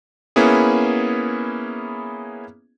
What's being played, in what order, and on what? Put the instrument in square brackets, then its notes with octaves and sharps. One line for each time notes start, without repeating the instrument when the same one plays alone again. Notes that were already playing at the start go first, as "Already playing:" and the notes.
[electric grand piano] A#3 B3 C#4 E4 G#4